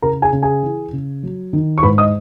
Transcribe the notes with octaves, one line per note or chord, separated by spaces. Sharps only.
C#3 A#4 A#5
G#4 G#5
C#3
G#4 G#5
E3
C#3
F#3
D#3
C#6
G#2 B4 B5
D#5 D#6